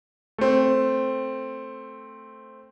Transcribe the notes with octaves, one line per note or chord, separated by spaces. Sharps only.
A3 C4